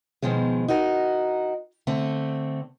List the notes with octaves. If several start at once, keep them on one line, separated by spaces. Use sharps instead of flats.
B2 D#3 F3 G#3
D#4 F#4 A#4
D3 A3 C4